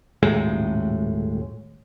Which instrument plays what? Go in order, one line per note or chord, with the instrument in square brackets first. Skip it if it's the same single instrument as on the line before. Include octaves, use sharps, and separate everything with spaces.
[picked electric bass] D#1 G#1 A2 G#3